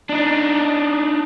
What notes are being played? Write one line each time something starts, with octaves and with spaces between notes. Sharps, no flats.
D4 D#4